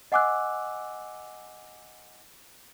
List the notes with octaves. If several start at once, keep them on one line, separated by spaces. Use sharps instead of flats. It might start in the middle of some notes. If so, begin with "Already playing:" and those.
D#5 F#5 G#5 D6 E6 F#6